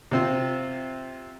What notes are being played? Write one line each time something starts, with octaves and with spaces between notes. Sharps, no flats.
C3 C4 F4